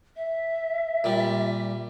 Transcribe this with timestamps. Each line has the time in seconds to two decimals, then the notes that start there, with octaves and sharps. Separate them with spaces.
0.16 E5
1.04 A#2 G3